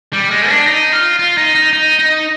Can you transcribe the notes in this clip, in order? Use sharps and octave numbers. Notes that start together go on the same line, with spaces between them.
G3
G#3
D4
D#4
F4
F4
D#4
D#4
D#4
D#4